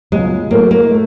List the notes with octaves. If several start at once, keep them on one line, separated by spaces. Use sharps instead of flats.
C#2 B2 F#3 G#3
A2 F#3 A3 A#3
A#3
A3